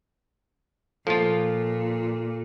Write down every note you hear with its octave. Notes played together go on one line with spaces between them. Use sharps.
A#2 F3 F4 A4